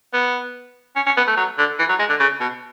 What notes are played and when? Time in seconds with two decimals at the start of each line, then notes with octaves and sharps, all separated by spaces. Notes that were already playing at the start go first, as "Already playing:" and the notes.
0.13 B3
0.96 C#4
1.06 C#4
1.17 B3
1.27 A3
1.37 F#3
1.58 D3
1.79 E3
1.89 F#3
1.99 G#3
2.10 D3
2.20 C#3
2.40 B2